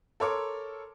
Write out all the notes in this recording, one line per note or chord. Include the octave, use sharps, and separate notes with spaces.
A4 A#4 C#5 C6 D6